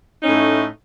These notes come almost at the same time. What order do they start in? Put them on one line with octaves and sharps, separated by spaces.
D#4 C#4 A2 A3